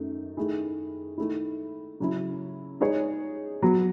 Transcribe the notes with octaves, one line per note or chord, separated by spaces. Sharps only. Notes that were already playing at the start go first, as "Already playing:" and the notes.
Already playing: F#2 D#3 A3 D#4
D#3 A3 E4 G#4
D#3 A3 E4
C#3 F#3 C#4 E4
G#3 D#4 G#4 C#5
F#3 B3 F#4